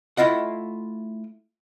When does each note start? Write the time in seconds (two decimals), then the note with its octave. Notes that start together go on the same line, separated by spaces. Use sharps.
0.17 A3 E4 F4 D#5 F#5